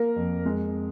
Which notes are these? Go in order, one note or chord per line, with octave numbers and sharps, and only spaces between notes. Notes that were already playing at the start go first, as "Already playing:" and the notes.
Already playing: A#3 A#4
F2
G#3